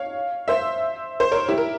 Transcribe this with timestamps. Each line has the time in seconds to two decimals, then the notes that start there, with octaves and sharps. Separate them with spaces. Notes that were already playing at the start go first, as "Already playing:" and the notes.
Already playing: C#5 F5
0.48 C5 E5
1.20 C5
1.32 A#4 C#5
1.49 E4 G4
1.58 A#4